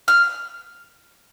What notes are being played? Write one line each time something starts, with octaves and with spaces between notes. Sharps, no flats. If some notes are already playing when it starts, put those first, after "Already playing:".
F6